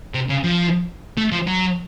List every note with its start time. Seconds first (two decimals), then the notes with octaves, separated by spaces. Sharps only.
0.14 C3
0.29 C#3
0.44 F3
1.17 A3
1.32 F3
1.47 F#3